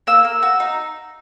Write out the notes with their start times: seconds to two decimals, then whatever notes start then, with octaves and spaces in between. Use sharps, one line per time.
0.07 A#3 E6
0.25 A#3
0.42 F#4 E6
0.60 D#4